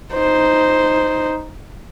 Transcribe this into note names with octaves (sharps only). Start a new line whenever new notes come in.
D#4 C5